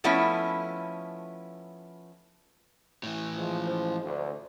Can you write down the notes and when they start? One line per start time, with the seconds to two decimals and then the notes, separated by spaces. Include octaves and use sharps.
0.04 F3 A3 B3 C#4 E4
3.03 A2 E3
3.36 F3 G#3
3.67 C5
4.04 D2